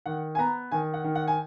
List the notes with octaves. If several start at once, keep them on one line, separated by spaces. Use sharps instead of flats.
D#3 F#5
G#5
B3 A#5
D#3 G#5
F#5
D#3
F#5
G#5